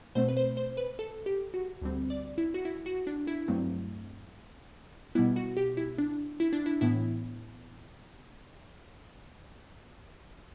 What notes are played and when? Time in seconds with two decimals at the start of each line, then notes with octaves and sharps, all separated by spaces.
0.15 B2 A3 C4 C5
0.29 B4
0.37 C5
0.57 C5
0.77 B4
0.99 A4
1.26 G4
1.54 F#4
1.82 D2 D3 G3 C4
2.10 D5
2.38 E4
2.54 F#4
2.65 E4
2.86 F#4
3.07 D4
3.27 E4
3.48 G2 F#3 A3 C4
5.15 B2 G3 B3 E4
5.36 F#4
5.57 G4
5.77 E4
5.98 D4
6.40 E4
6.53 D4
6.66 E4
6.81 A2 E3 B3 E4